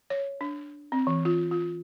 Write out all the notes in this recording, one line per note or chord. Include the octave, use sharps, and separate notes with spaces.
C#5
D4
C4
E3
F4
F4